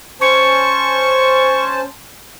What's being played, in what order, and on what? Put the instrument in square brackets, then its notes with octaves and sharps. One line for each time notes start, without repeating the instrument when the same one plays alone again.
[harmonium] C#4 C5 A5 [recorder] C#6